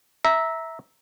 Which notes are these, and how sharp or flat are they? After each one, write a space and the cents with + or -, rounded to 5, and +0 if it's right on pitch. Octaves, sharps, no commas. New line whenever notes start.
E5 -15 A#5 +0